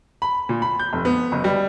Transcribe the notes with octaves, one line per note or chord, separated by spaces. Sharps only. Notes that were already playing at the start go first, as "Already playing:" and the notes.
B5
A#2
B5
G6
F1
B3
F#1
G3